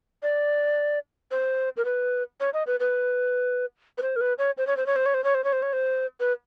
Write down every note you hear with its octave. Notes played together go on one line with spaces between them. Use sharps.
D5
C5
A#4
B4
C#5
D#5
B4
B4
B4
C5
A#4
B4
C#5
C5
C#5
C5
C#5
C5
C#5
C5
C#5
C5
C#5
C5
C#5
C5
B4